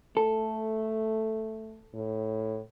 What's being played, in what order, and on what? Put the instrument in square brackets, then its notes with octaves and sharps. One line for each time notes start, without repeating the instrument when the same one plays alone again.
[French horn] A3 [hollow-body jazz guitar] A4
[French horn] A2